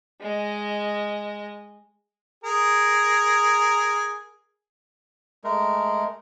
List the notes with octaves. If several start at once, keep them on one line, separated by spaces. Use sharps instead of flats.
G#3 D#5
G#4 A#4
G#3 A3 A#4